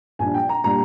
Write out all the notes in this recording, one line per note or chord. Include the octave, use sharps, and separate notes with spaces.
A#1 A#2 G3 D4 G#5
G5
A#5
A#2 G3 D4 A#5